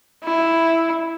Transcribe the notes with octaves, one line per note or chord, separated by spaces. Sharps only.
E4